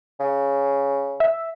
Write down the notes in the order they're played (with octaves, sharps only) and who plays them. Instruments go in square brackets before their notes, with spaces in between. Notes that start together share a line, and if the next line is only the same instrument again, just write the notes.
[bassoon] C#3
[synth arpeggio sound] E5